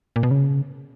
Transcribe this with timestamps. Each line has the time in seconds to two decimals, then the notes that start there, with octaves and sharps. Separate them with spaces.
0.16 A#2
0.23 B2
0.31 C#3